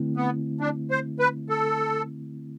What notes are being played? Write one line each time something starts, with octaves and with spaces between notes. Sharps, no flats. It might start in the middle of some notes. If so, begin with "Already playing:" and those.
Already playing: D3 A3 C4 E4
B3
D4
C5
B4
A4